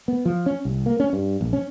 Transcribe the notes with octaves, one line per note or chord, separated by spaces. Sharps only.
B3
F3
C#4
C2
A#3
C#4
G2
A#1
C#4